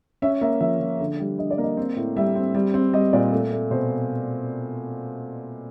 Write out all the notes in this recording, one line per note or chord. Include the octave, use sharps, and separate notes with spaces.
C#4 E5
A#3 E5
F3 E5
F3
D3
G3
D3 D#5
D5
A#3
D#5
C4
A2
G3 E5
C4
G3
C4
G3 D#5
A#2 D5
A3
A3
B2 C5